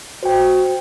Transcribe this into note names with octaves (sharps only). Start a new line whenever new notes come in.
F#4 C5 G5